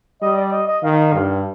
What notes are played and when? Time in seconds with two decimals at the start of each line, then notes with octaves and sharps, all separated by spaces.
0.22 G3 D#5
0.37 D5
0.52 D#5
0.68 D#5
0.83 D#3 F5
1.13 G2